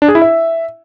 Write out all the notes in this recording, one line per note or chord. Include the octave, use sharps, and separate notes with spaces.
D4
G#4
E4
E5